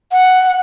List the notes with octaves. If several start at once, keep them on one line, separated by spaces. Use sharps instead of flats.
F#5